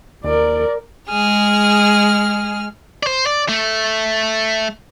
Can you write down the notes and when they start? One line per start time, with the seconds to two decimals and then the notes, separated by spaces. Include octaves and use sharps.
0.24 D#2 A#4 D5
1.08 G#3 G#4 F6
3.03 C5 D5
3.26 D5
3.49 A3